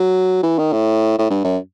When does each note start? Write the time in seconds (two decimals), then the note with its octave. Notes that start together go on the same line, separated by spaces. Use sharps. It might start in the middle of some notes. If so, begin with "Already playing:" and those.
Already playing: F#3
0.43 E3
0.58 D#3
0.73 A2
1.18 A2
1.30 G2
1.45 F#2